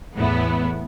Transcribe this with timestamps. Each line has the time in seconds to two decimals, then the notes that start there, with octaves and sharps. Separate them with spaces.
0.15 E2 A2 B3 E4